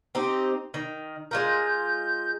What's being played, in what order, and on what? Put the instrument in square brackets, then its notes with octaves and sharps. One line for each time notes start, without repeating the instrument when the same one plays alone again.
[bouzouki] C4 D#4 G4
D#3
[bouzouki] G#3 F4 A#4 [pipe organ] G6